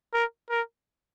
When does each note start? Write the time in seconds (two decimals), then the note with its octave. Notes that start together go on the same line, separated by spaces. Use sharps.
0.14 A#4
0.50 A#4